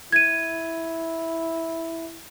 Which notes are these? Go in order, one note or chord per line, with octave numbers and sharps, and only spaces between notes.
E4 G#6 D#7